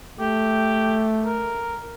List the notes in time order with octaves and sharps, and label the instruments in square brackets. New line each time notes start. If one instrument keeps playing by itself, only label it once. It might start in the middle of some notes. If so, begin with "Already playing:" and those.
[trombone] A3 [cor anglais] G4
[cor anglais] A#4